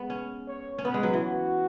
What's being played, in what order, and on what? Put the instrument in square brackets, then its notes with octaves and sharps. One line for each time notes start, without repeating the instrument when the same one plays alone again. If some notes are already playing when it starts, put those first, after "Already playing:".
Already playing: [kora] G#3 B3
C#4
[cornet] C#5
[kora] C#4
[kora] B3 [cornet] B4
[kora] G#3
F#3
E3
[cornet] F#4